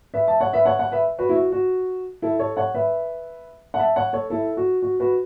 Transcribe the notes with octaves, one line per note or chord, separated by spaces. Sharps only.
B4 E5
E5 A5
C#5 F#5
B4 E5
C#5 F#5
C#5 F#5
B4 E5
F#4 B4
E4
F#4
F#4
E4 A4
A4 C#5
C#5 F#5
B4 E5
F#5
E5 A5
C#5 F#5
A4 C#5
E4 A4
F#4
F#4
F#4 B4